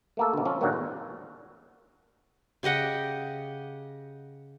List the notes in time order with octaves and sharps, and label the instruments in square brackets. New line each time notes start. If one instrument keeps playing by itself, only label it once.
[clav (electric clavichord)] A3 A#3 A4
D2 B2
F3 C#4
G2 A#2 D#3 F#3 F#4
E2
[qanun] C#3 G4 D#5 F#5